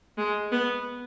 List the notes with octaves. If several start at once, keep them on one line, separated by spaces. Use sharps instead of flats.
G#3
B3